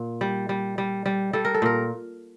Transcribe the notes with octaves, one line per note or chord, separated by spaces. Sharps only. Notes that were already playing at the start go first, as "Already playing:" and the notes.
Already playing: A#2
G3
G3
G3
G3
G3 A4
A#4
A4
A#2 A#4